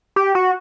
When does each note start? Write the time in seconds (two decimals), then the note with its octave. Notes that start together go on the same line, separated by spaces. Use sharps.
0.16 G4
0.35 F#4